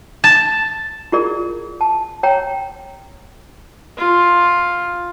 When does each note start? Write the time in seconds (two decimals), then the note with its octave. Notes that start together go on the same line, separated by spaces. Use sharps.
0.24 A5
1.12 E4 F4 G#4 A#4 D5
1.81 A5
2.23 C#5 G5 A#5
3.97 F4